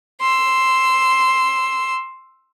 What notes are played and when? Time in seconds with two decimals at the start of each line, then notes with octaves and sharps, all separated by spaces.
0.21 C6 E6